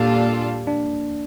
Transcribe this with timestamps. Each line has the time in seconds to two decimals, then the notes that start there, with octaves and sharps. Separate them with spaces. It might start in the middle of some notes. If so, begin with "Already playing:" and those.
Already playing: A#2 G3 A#3 D4 F4 A4
0.67 D4